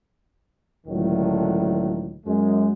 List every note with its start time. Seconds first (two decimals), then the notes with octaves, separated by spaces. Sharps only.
0.87 C#2 A2 D3 D#3 F#3
2.25 F#2 G#3